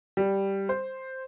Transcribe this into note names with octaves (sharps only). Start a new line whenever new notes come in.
G3
C5